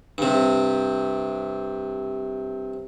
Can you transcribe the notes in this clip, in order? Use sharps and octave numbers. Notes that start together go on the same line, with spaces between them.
G2 C3